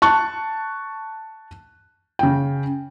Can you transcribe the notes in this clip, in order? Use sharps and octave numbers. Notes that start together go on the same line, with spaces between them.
A5 C#6 F#6
C#3 G5